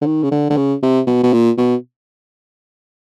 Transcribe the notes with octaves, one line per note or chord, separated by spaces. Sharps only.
D3
D#3
C#3
D3
D3
C#3
C3
B2
B2
A#2
B2